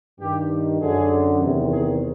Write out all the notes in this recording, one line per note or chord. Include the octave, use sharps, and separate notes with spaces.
G2 D#3 G4
F#2 D3 G#4
E2 C3 D#3
G#4